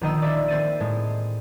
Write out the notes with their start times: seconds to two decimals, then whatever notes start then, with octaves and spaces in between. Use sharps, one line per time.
0.01 A#1 D#3 D#5 E6
0.22 D5 E5
0.48 C4 A6 D#7
0.80 A2 G#3